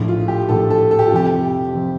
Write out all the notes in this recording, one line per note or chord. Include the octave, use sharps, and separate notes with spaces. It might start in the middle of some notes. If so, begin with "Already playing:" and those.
Already playing: A#1 A2 F3
F4
G4
A#1 A2 F3 A4
A4
A4
G4
F4
F2 C3 F3 G4
C3 F3